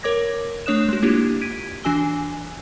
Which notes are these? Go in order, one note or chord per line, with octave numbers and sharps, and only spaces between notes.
A#4 C#5 D6 G#6 A#6
A3 D4 C#5 D#6 F#6 E7
G#3 F#4
A#3 D4 E4 F4 G4
G#6 B6 D7 D#7
E3 D4 F#4 G#5 E6 G7